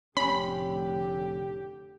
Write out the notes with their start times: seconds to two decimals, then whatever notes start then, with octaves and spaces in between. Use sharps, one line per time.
0.17 F1 A2 D3 C#4 G4 B5